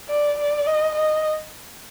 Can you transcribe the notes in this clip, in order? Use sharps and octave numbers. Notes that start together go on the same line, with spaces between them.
D5
D5
D#5
D#5